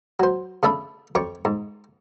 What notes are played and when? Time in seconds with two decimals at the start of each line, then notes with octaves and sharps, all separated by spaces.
0.20 F#3 C5
0.63 C#3 A3 D4 E5 B5
1.15 F2 C#5 C#6 D6
1.45 G#2